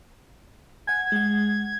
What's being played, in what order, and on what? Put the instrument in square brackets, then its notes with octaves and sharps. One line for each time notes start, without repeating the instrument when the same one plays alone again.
[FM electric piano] F#5 G#5 [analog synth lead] G#6
[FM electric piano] G#3 F#5